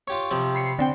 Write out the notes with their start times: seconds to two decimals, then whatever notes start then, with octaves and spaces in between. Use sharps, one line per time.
0.08 F4 G4 C#5 C#6
0.31 C3 F3 G3
0.55 B5 C7 C#7
0.79 D3 C4 G5